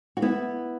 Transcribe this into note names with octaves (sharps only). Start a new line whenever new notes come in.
F#4
B3 E4